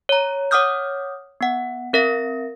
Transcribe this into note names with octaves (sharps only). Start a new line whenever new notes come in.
C#5 A#5
C#5 F#5 D6 D#6 F6 G6
B3 F#5
C4 A#4 E5 A#6